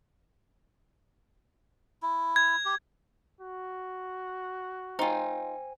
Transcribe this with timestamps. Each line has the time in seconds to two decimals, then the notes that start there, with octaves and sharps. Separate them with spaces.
2.02 E4
2.36 G#6
2.65 G4
3.41 F#4
4.99 D#4 F4 C5 G5 G#5